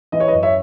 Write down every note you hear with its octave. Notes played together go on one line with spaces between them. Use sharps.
E3 D#5
C#5
B4 D#5
F#2
C#5 E5